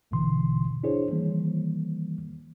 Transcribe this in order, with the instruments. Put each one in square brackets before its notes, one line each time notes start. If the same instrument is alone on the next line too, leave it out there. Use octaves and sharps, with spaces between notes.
[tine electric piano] A1 G#2 B2 D3 E3 C6
D4 E4 G#4 C5 C#5
D#3 E3 G3 A#3